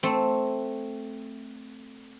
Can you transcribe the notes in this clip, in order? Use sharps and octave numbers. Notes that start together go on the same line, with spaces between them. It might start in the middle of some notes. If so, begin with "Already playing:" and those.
A3 C4